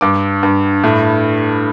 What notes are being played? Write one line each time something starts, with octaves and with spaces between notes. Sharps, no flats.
G2 D6
G2
A2